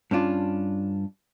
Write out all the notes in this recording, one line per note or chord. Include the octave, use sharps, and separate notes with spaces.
G2 C#4 D4 F4